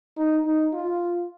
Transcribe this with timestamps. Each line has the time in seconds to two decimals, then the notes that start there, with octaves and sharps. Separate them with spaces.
0.17 D#4
0.45 D#4
0.74 F4